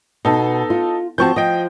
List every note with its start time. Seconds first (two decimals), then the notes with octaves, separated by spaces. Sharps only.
0.25 B2 D#4 A4
0.70 F4
1.18 F3 C4 F#4 A5 C#6 G6
1.36 F3 D#5 G5